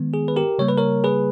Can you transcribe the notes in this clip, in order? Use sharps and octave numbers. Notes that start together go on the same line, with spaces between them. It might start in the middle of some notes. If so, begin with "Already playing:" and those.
Already playing: D#3 G#3 B3
G#4
B4
G4 A#4
C#3 G3 A#3 C#5
B4
A#4 C#5
G#4 B4